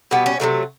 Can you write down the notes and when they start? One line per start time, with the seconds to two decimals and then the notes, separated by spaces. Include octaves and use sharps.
0.11 B2 G3 B3
0.26 C#4
0.40 C3 D#3 F#3 A3